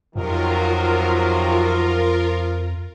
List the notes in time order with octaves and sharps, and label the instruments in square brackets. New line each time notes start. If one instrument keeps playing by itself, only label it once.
[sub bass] F2 [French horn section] C3 D#3 F#3 [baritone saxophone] F3 [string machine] F4 A#4